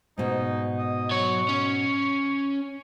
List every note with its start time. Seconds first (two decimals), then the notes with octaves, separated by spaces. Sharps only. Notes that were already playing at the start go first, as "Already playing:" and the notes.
0.18 G#2 B2 D#4
0.78 D#5
1.11 F#3 C#5 C#6
1.49 C#4